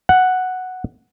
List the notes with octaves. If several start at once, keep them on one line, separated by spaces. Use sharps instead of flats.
F#5